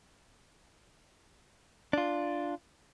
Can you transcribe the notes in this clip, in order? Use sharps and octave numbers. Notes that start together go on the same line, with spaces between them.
D4 F4